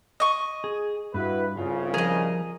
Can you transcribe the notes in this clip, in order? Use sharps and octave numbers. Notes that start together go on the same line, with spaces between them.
D#5 C#6
G#4
G2 E4 F#4 B4
C2 C#3 F4
F3 G#4 A#4 D#5